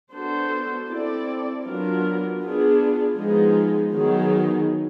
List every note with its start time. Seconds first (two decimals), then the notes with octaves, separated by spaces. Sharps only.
0.12 B3 D4 F#4 A4 C5
0.88 C4 E4 A4 D5
1.64 F#3 B3 D4 F4 A#4
2.40 B3 D4 F4 G#4
3.17 F3 G#3 B3 D#4 G#4
3.93 D#3 F#3 B3 D#4 G#4